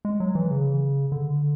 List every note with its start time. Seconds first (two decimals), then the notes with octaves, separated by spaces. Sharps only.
0.05 G#3
0.20 F#3
0.35 E3
0.51 C#3
1.12 D3